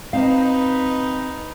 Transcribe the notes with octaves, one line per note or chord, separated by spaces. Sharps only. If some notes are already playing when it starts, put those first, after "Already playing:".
C4 D#4 B4 F5